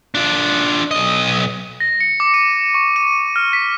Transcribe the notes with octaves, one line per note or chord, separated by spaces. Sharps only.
D4 F4
B1 D#5
A#6
C#7
D6
D#7
C#6
D#7
F6
B6